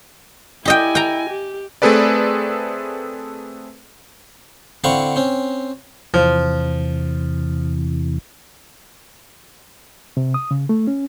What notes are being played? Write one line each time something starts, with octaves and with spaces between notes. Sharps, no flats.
E4 G4 D#5 G5 G#5
G5 A#5
G4
A3 C4 G#4 A4 B4 D5
D3 C4 E4 F5 F#5 C#6
C4 C#4
E2 C3 E3 F3
C3
D#6
C#3
A3
C#4